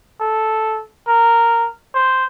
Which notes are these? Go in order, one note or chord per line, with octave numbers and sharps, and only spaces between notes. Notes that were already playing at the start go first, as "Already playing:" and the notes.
A4
A#4
C5